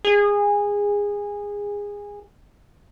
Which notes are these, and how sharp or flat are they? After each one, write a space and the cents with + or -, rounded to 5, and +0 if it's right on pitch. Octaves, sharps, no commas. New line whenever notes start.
G#4 -20